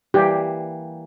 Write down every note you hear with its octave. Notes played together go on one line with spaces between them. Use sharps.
E3 G3 A#3 G4